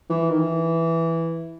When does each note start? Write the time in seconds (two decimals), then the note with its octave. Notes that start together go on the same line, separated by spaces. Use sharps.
0.10 E3
0.30 D#3
0.39 E3